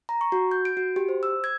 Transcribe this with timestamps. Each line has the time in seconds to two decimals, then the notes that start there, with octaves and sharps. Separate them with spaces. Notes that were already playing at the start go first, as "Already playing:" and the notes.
0.09 A#5
0.21 C#6
0.32 F#4
0.51 G6
0.65 D7
0.77 F#4
0.96 G4
1.09 C5
1.23 E6
1.44 G#6